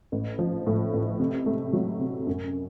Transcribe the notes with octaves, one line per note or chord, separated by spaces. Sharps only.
A1
F3
A2
A1
C3
A3
F#3
C3
F#2